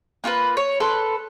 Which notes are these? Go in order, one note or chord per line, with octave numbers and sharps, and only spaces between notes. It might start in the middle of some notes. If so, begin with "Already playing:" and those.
A#3 F4 A4 B4
C#5
A4 B4 C6